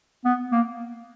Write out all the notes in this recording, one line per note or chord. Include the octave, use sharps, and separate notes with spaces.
B3
A#3